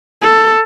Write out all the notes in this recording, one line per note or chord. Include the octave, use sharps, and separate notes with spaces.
A4